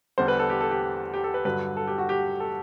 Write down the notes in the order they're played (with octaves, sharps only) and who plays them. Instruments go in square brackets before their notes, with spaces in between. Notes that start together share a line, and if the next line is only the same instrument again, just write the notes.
[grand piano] E2 D3 G3 C5
B4
A4
G4
A4
G4
G4
A4
B4
G2 D3 F#3 B4
A4
G4
F#4
G4
A4